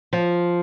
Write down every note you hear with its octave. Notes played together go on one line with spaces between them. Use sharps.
F3